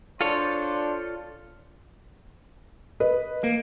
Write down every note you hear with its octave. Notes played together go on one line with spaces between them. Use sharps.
D4 F4 A4 C5 C#5
B4 D#5
A#3